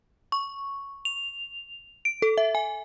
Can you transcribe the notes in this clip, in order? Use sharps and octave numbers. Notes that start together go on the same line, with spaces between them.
C#6
F7
D7
A4
E5
G#5